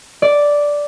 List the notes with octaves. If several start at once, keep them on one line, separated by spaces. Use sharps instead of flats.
D5